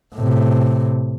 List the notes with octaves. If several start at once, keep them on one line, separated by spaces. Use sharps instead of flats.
A2 C3